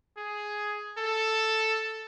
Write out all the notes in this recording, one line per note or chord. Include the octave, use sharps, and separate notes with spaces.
G#4
A4